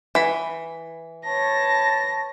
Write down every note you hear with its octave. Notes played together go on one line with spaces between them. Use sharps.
E3 B5
B4 C#5 A5 A#6